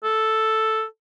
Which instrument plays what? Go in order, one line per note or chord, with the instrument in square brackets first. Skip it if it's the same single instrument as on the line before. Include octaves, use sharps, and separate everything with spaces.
[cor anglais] A4